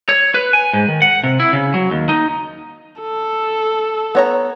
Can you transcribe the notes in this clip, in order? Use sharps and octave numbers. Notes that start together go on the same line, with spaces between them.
C#5
B4
G#5
G#2
D#3
F#5
C3
E4
C#3
F#3
D#2
D#4
A4
B3 C#5 A#5